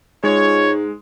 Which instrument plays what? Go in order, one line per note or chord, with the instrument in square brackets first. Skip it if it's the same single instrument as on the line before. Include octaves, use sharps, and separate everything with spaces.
[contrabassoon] G#2 [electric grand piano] G#3 [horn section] F4 C#5